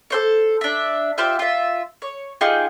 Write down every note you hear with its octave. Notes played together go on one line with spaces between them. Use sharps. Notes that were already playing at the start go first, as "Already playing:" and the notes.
A4 C5 C#5
D4 E5
F4 G4 C5 E5
F4 E5
C#5
D#4 F4 G4 G#4